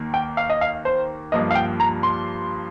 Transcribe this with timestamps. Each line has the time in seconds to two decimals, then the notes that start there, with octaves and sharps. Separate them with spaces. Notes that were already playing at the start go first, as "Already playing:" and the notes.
Already playing: D#2 D#3 A#3
0.14 G5
0.37 F5
0.50 D#5
0.61 F5
0.85 C5
1.32 G2 F3 A#3 D#5
1.51 F5
1.55 G5
1.80 A#5
2.03 C6